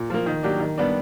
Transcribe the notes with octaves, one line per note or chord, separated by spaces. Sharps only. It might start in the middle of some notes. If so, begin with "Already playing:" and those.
Already playing: A#2
F3 A#3
D#3
F#3 A#3 D4 G4
D#3
G3 B3 D4